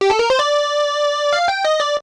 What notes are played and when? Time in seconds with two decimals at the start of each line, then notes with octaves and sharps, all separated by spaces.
0.01 G4
0.10 A4
0.19 A#4
0.30 C5
0.39 D5
1.33 F5
1.48 G5
1.65 D#5
1.80 D5